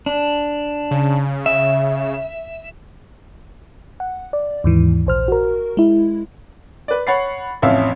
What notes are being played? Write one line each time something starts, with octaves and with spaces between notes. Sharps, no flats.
D4
C#3
E5
F#5
D5
D#2 G#2 E3
A#1 C5 F6
F#4 A#4
G#3 E4
B4 D5
C#5 F#5 B5 A6 C7
A1 F2 C#4 E5 F5